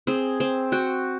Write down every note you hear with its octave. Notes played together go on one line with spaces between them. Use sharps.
C4 G#4
C4
F#4 G5